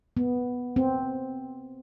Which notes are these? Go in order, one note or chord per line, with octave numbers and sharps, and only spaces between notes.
B3
C4